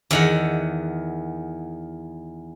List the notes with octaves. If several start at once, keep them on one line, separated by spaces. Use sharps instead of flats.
E2 D#3 F#5